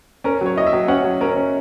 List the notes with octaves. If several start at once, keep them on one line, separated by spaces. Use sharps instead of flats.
C#4 A#4
F#3 C#5
E4 D#5
E5
F#3
C#4 F#5
F#3
C#4 A#4
C#4